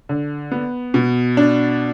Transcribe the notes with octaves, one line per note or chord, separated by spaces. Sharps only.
D3
B3
B2
D4